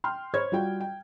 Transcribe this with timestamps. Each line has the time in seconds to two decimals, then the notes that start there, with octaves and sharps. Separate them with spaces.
0.04 G5 C6 F6
0.34 C5 C#5 B5 C#6 G#6
0.52 G3 F4 F#4 G5
0.80 G5